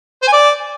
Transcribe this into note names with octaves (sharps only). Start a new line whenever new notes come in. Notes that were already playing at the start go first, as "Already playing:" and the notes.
C5
G#5
D5